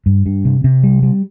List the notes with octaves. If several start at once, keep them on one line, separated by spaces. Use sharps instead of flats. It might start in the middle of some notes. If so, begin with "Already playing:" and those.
G2
G2
C3
C3
G3
G3